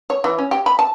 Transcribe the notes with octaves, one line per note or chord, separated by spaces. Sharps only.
C#5
E3
C#4
G4
B5
A5